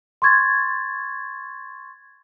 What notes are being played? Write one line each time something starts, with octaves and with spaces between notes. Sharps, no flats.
C6 C#6 G#6 A6